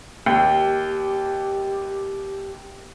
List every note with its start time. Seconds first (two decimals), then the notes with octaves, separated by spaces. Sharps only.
0.26 D#2 G4